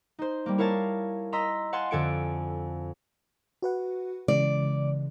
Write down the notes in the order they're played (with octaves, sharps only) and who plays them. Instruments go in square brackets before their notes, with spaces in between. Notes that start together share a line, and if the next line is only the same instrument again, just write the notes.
[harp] D#4 C5
G3 A#3
E4 A#4 C#5 F5 A5
D#5 A#5 C6 E6 B6
F5 F#5 G#5 A5 C6
F2 D3 A4 G#5 C#7 D7
[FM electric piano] F#4 B4 F#5
[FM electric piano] C#3 E3 G#3 [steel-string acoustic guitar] D5